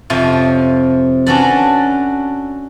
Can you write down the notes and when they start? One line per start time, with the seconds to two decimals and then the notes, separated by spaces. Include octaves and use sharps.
0.10 F2 C3 F3 F4 C#5
1.26 C#4 D4 F#4 A4 B4 D5